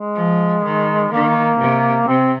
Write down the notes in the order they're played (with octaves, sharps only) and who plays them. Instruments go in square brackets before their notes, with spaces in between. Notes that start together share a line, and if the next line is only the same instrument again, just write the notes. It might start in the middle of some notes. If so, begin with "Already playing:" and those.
Already playing: [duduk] G#3
[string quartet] F3
D#3
[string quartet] D#3 [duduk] A#3
[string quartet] C3
[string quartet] C3 [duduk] C4